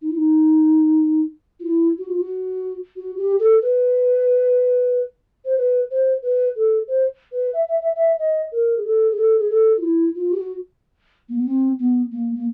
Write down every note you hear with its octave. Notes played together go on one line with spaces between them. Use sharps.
D#4
E4
D#4
F4
E4
F#4
F4
F#4
F#4
G4
A4
B4
C5
B4
C5
B4
A4
C5
B4
E5
E5
E5
E5
D#5
A#4
G#4
A4
G#4
A4
G#4
A4
F4
E4
F4
G4
F#4
A#3
B3
C4
B3
A#3
A#3